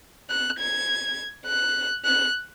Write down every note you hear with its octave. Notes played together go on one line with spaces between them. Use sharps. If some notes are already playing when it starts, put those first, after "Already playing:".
F#6
G#6
F#6
F#6